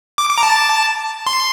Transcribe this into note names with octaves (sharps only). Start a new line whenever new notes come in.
D6
D6
A#5
A5
C6